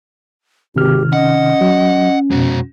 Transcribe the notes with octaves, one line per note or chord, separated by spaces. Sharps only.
G#1 C3 D#3 G4 F6
C#4 D#5 F#5
F#3
F2 B2 G#3 F#4